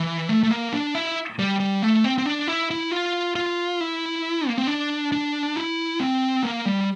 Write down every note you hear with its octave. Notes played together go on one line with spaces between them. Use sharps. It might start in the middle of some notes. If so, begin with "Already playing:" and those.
Already playing: E3
A3
A3
A#3
D4
E4
G3
G3
A3
C4
C4
D4
E4
E4
F4
F4
E4
A#3
C4
D4
D4
E4
C4
A#3
G3